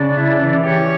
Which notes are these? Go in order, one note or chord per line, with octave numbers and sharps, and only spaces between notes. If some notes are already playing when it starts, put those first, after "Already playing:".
Already playing: C#3 D4 D5
E4
E3
B4
C#4 G4 C#5